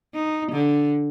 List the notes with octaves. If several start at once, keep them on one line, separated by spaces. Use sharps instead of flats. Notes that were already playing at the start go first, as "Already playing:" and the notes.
D#4
D3